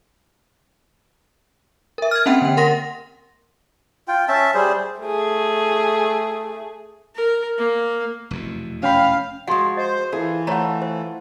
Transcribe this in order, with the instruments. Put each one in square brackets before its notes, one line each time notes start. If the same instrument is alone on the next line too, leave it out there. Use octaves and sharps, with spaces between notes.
[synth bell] A#4 E5
F6 G#6
A#3 C4 C#4 E5 F#5 G5
D3 G5
A#4 F#5 C6 A#6
[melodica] F4 G5
C#4 E5 A5
G3 G#4 C5
[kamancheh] A3 G#4
[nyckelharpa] A#4
A#3
[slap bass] F1 E2 B2
[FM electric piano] C#4 G5 B5 [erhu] F5
[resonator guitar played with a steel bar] F3 G#3 [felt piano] F#4 G#4 [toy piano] F5 C6
[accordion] C5 [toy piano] D#5
[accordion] E3 [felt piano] E4 F4 A4 [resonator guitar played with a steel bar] G#4
[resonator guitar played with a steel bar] A3 [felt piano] E4 F4 F#5 [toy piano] C5 C#5 A#5
[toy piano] C5